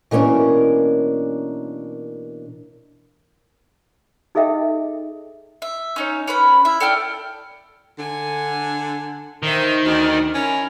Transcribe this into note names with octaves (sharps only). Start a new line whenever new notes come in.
B2 E3 A#3 C#4 D4 A#4
D#4 G#4 A4 D#5 E5 G5
E5
C#4 D#4 C#5
C#4 B4 B5
E4 E5
A4 D5 G5 F6
D3 G#5
D#3 C5 E5
D2 D5 D#5
C#4 E4 A#4